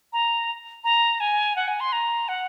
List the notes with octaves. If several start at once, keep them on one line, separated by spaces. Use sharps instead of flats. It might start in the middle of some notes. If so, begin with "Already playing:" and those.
A#5
A#5
G#5
F#5
G#5
C6
A#5
F#5